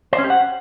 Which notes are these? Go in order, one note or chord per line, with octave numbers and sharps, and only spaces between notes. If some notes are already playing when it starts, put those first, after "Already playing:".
C5
C#4
G4
F#5